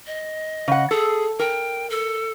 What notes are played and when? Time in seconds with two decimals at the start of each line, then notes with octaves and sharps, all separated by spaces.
0.07 D#5
0.68 C#3 F#5
0.91 G#4 A4
1.39 A#4 G5
1.90 A4